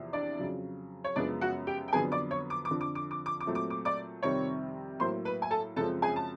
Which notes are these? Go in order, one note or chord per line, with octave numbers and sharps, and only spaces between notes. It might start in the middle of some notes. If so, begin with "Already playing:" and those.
Already playing: E2 C3 F3
D4 D5
F2 C#3 F#3
C#5
F#2 C#3 F3 G#3 B3 D4 D5
F#4 F#5
G4 G5
G5
F2 D3 F#3 B3 G#4 G#5
D5 D6
C#5 C#6
D6
D6
F2 D3 F3
D6
D6
D6
D6
D6
A#2 F#3 A3 C4
D6
D6
D5 D6
F2 C3 D#3 G3 C4 C#5 C#6
A2 F#3 A#3 C5 C6
B4 B5
G#5
A4 A5
F#2 C#3 F3 G#3 C4 A4 A5
G#4 G#5
A5